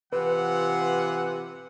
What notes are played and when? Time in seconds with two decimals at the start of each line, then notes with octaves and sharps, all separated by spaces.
0.13 C3 E3 F4 B4 F#5